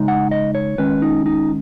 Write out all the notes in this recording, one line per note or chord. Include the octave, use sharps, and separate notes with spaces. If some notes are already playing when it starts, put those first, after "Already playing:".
Already playing: C#3 G#3 D#4
F#5
D#5
C#5
D#3 G#3 C#4 B4
D#4
D#4